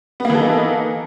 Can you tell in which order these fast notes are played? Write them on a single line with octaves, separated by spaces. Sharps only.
B3 A#3 E3 A4 D#4